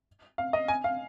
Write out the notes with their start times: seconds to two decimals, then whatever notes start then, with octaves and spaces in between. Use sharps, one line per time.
0.38 F5
0.53 D#5
0.68 G#5
0.84 F5